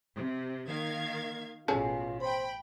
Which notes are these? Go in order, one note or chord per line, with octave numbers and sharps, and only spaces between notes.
C3
D#3 A#3 F5 G#6
A1 B2 C#4 F4 G#4 A4
C5 G5 B5